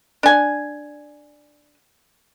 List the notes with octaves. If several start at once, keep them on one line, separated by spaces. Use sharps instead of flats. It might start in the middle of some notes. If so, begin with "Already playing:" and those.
D4 G#5